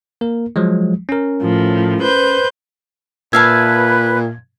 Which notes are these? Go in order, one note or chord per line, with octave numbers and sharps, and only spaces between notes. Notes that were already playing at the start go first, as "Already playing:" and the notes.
A#3 A#4
F3 F#3 G#3
C#4 A#4
A2 F3
B4 C5 G6
A#2 B4 E5 F5 A5 G#6